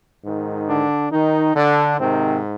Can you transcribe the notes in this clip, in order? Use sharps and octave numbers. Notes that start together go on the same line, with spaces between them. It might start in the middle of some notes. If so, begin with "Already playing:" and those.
G#2 D#3
D3 D4
D#3 D#4
D3 D4
G#2 C3 D#3 C4